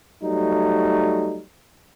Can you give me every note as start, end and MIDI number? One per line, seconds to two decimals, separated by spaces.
0.23 1.41 54
0.23 1.41 55
0.23 1.41 57
0.23 1.41 63